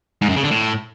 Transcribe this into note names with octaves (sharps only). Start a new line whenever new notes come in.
G#2
F#2
C#3
D3
A2